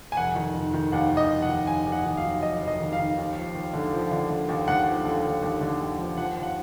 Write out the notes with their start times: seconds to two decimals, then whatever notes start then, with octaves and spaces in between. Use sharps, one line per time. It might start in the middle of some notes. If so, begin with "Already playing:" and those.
0.12 G#5
0.17 F1 F#5
0.36 D#3
0.54 F1
0.74 D#3
0.92 D#2 F#5
1.11 D#2
1.17 D#5
1.29 F1
1.42 F#5
1.49 D#3
1.67 D#2 G#5
1.86 D#2
1.92 F#5
2.05 D#3
2.17 F5
2.24 F#3
2.42 F1 D#5
2.61 F1
2.67 D#5
2.80 D#3
2.93 F5
2.99 D#3
3.17 D#2
3.36 F3
3.55 D#2
3.73 D3
3.93 F3
4.12 D3
4.30 D3
4.49 D#2
4.67 D#2 F#5
4.86 F3
5.05 D3
5.24 D#2
5.42 D#2
5.61 D3
5.80 D#2
5.99 F3
6.17 F3 F#5
6.36 D#2
6.43 F#5